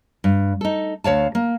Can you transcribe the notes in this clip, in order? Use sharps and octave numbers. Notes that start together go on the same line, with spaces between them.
G2
D#4 A4
D2 C#5 F5 A5
A#3